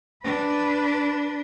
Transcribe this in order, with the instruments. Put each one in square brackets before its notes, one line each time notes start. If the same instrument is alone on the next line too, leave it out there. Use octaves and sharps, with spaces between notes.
[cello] D4 B4